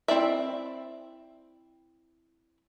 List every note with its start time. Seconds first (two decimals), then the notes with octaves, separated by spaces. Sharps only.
0.08 C4 E4 D5 E5